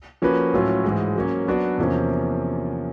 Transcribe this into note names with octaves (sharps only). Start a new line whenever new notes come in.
F3 A#3 C#4 F#4 B4
A2 F#3 A3 C#4 F4
G#2 E3 G#3
F#3 A#3 C#4
F#3 B3 D4 F#4
E2 C3 F3 A#3 C#4